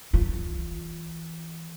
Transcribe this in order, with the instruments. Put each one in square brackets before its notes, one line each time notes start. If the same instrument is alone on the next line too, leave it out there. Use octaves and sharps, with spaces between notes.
[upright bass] E3 F4